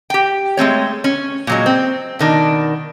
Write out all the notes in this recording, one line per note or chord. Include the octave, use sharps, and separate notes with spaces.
G4 G5
G#3 A3 C4 C#5
C#4
A#2 F#3 G#3
C4
B2 D#3 D4